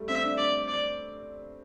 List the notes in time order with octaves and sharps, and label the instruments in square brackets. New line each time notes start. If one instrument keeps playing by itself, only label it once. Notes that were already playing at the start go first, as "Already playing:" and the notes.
Already playing: [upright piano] G3 A3
[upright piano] C4 [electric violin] E5
[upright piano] D4
[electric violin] D5
D5